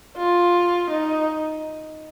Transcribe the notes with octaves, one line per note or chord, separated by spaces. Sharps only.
F4
D#4